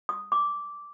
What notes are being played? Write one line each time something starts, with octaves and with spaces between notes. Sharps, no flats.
D#6
D6